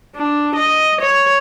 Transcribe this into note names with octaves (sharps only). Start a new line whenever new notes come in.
D4
D#5
C#5